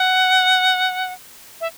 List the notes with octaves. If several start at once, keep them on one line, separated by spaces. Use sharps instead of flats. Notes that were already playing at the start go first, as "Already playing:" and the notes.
Already playing: F#5
E5